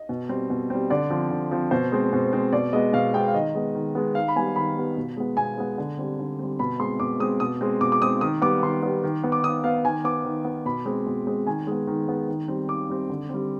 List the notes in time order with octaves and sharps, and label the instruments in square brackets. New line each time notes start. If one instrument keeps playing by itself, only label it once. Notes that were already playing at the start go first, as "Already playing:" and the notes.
Already playing: [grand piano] D#5
B2
G3 C4
B2
G3 C4
D3 D5
F3 C4
D3
F3 C4
B2 C5
G#3 C4
B2
G#3 C4
B2 D5
G#3 B3 D#5
B2 F5
G#3 B3 G5
F5
D#3 D#5
G#3 B3
D#3
G#3 B3
D#3 F5
B5
G3 B3 G#5
D#3 B5
G3 B3
B2
G#3 B3
B2 G#5
G#3 B3
D3
G3 C4
D3
G3 C4
B2 B5
G#3 C4 C6
B2 D6
G#3 C4 D#6
B2 D#6
G#3 C4
B2 D6
D6
G#3 C4 D#6
D#3 D#6
G3 B3 D6
D#3 C6
G3 B3
D#3
B3
D6
D#3 D#6
B3 F5
D#3 G#5
B3 D6
D#3
B3
B2 B5
G#3 C4
B2
G#3 C4
D#3 G#5
G#3 B3
D#3
G#3 B3
D#3
G3 C4
D#3 D6
G3 C4
D3
G3 C4